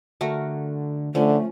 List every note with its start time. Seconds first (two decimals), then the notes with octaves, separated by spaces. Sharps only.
0.21 D3 A3 F#4 A#4
1.15 D3 F3 A3 C#4